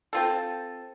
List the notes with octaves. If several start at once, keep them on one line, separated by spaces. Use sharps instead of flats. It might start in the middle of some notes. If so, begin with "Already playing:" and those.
C4 F4 A4